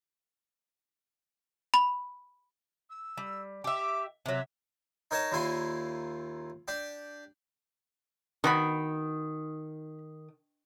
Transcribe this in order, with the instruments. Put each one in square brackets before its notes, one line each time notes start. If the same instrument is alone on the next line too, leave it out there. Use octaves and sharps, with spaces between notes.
[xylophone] B5
[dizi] E6
[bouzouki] G3
[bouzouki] G4 E5 [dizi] D6
[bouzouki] C3 F#3 [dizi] E5
[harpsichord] D#4 A#4 C#5 D#5 A5
D#2 A#2 E4 G#5 C6
D4 G4
[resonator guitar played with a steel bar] D#3 [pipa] B3 F#4 B5